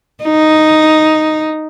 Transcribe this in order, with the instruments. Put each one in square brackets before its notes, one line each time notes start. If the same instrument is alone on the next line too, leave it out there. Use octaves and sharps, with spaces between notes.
[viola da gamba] D#4